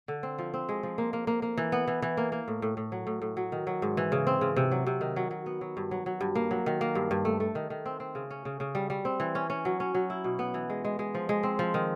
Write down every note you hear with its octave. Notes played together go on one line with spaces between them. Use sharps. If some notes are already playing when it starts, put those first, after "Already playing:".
D3
C4
F3
C4
G#3
F3
A#3
A#3
A#3
A#3
E3
B3
E3
E3
A#3
A#3
A2
A2
A2
F#3
A2
A2
F#3
D#3
F#3
G#2
E3
C#3
C4
C#3
C3
F#3
C3
D#3
F#3
F#3
B3
F#3
G2
F#3
F#3
G2
A#3
F#3
D#3
A#3
G2
G2
A3
A3
D#3
D#3
C4
C4
C#3
C#4
C#3
C#3
G3
G3
C4
E3
C#4
C#4
F#3
C#4
F#3
E4
B2
B3
E3
G#3
G#3
G#3
F3
G#3
C4
F3
D#3